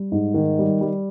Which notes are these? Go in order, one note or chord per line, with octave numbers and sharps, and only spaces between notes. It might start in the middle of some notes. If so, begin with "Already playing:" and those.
Already playing: G3
G#2
D#3
G3
G3